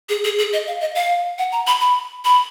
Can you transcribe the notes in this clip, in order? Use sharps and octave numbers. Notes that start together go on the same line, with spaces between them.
G#4
G#4
G#4
D#5
F5
D#5
F5
F#5
A#5
B5
B5
B5